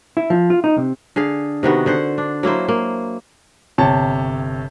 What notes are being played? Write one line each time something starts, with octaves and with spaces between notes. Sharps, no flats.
E4
F3
F4
D#4
C3
D3 G#4 F5
C3 D#3 B3 F#4
D3 C5 F#5
D4
F#3 A#3 E4 C5
A#3
G1 C3 C#5 A5